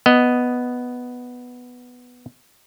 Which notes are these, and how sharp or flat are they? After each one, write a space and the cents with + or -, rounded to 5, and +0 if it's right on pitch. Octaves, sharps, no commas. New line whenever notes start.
B3 +0 D#5 +0